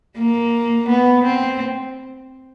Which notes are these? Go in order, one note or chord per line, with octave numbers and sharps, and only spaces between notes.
A#3
B3
C4